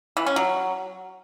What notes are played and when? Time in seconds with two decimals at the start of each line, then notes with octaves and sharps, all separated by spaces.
0.17 E3
0.26 C#4
0.36 F#3